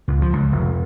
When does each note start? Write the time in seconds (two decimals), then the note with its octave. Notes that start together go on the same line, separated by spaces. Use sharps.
0.08 C#2
0.22 F3
0.33 C#2
0.52 F1